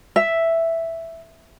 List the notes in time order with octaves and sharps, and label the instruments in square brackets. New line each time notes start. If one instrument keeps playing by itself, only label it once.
[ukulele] E5